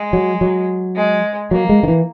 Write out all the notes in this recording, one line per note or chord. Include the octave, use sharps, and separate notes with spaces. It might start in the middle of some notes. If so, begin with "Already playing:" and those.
Already playing: G#3
F#3
F#3
G#3
F#3 A#3
G#3
D#3
E3